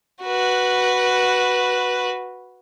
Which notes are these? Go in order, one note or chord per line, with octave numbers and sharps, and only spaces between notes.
F#4 B4